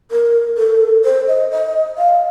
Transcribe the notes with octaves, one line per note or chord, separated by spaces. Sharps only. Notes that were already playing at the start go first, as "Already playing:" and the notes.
A#4
A4
C5
D#5
D#5
F5